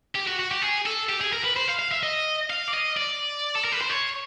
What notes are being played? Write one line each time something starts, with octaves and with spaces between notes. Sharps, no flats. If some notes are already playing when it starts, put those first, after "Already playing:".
G4
F#4
F#4
G4
G#4
A4
G4
G#4
A#4
B4
C5
F5
F5
E5
D#5
F5
D5
D#5
D5
A4
A#4
B4
C5
C#5